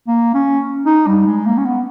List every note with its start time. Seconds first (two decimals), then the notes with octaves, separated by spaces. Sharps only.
0.08 A#3
0.34 C#4
0.86 D#4
1.07 G3
1.26 G#3
1.46 A#3
1.58 C#4
1.65 B3